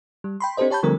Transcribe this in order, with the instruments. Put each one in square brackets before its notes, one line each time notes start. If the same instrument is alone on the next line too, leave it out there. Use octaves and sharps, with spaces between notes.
[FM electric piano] G3
G5 B5 C6
C4 D4 G4 A4 C5 D#5
G4 C#5 A5 B5 G6
D3 F3 G3 A3 C4 A#4